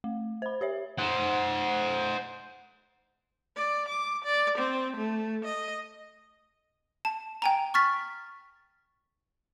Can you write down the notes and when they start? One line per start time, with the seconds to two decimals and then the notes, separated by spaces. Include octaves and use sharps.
0.04 A3
0.42 C5 B5
0.61 G4 C#5 E5
0.99 C5 F#5
3.57 D5
3.89 D6
4.25 D5
4.59 C4
4.97 A3
5.45 D#5
7.05 A5
7.42 G5 G#5 A#5
7.74 C#6 F6 A6 B6